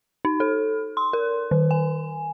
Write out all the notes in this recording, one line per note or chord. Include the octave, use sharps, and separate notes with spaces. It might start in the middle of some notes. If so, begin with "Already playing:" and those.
D#4
A4
C6
A#4
D#3
G#5